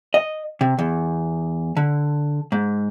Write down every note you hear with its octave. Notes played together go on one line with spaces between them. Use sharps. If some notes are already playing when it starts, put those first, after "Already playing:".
D#5
C3
E2
D3
G#2